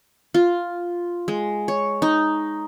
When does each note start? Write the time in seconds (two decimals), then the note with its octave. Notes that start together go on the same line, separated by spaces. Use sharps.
0.34 F4
1.28 G#3
1.68 C#5
2.02 D#4